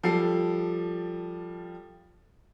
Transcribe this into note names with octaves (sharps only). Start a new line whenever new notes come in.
F3 G3 A4 C7